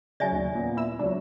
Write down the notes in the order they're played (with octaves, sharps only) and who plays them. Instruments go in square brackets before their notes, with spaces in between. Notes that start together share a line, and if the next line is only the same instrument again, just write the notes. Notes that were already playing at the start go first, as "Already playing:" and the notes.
[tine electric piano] C#3 F#3 [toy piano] D5 E5 G#5 [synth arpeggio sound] A6
[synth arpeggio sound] D#2
[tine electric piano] A#2 B3
[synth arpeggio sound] E4 E6
[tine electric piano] C#2 F#3 [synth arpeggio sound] D4